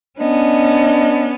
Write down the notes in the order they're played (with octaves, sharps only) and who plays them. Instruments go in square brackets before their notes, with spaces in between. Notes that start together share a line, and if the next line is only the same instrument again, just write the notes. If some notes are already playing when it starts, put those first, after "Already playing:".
[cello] B3 C#4 [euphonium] D4 [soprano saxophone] D#5